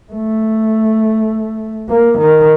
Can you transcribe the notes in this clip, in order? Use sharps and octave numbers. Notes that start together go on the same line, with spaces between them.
A3
A#3
D#3